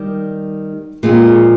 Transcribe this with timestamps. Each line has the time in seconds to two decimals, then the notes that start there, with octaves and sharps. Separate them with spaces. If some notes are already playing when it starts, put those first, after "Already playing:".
Already playing: D#3 G3 G4
1.03 A#2 F3 G#3 C4